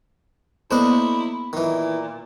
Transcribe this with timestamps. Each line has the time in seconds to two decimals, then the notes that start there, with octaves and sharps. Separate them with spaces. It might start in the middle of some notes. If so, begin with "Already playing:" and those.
0.71 A#3 B3 E4 A4 C5 D5 D#5
1.53 A#2 D#3 E3